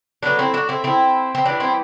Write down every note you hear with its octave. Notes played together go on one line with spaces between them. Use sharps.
A2 F#3 B3 D4
C4 E4
D4 F#4
C4 E4
C4 E4
C4
E3 G3 B3 D4
C4 E4